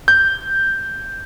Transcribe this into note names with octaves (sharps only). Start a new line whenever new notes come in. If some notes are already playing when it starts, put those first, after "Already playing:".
G6